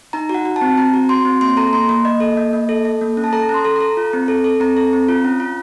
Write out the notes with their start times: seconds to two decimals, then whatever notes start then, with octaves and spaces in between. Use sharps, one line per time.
0.13 D#4 A#5
0.29 F#4
0.34 F#5
0.45 F#4
0.56 A5
0.61 C4
0.77 C4 A#5
0.94 F#4
1.09 F#4 C6
1.25 C4
1.41 A#3 C6
1.57 A4 A#5
1.73 A#3 C6
1.89 A#3
2.05 A#3 D#5
2.20 A4
2.37 A#3
2.53 A#3
2.69 A4
2.85 A4
3.01 A#3
3.17 C#4
3.24 A5
3.33 A4 A#5
3.49 C#4 C6
3.65 A4
3.76 A4 A#5
3.97 F4
4.13 C4
4.28 A4
4.44 A4
4.60 C4 A#5
4.77 A4
4.93 C4
5.09 F4
5.24 C#4
5.40 F4